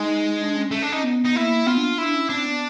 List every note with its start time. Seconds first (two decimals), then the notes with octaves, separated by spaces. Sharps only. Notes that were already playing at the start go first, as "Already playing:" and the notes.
Already playing: G#3 D#4
0.41 D4
0.56 C#4
0.71 A3
0.82 D4
0.92 D#4
1.03 B3
1.25 D#4
1.35 A#3 E4
1.67 B3 F4
1.78 D4
1.98 D4 E4
2.14 C#4
2.30 C4 D4
2.46 B3